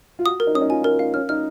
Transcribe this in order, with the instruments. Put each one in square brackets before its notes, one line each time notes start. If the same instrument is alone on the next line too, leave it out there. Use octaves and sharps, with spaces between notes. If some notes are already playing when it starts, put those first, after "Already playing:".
[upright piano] F4
[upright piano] F#4 [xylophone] D#6
[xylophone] A#4
[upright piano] D#4
[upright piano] C#4 [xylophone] D#6
[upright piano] D#4
[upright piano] F4 [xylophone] G#5
[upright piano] D#4 [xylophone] A#4
[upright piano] D#4 [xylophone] F5
[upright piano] C#4 [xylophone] F6
[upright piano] D#4 [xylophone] F6